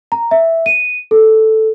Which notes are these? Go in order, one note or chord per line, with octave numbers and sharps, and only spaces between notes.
A#5
E5
D#7
A4